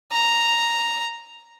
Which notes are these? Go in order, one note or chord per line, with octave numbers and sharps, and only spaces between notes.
A#5